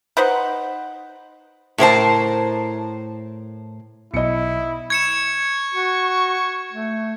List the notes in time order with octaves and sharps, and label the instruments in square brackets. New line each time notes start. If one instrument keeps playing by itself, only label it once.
[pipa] D#4 B4 C5 F#5
[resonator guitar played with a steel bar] A2 A#4 C5 A5
[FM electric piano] B1 [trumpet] E4 [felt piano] D#5 C#7
[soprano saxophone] C#6 [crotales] G#6 C#7 E7
[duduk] F#4
A3